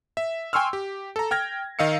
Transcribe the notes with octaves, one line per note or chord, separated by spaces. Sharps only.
E5
G5 G#5 C6 C#6 E6 F6
G4
A4 A#5
G5 F6 G#6 A#6
D#3 D#5 F5 E6 C#7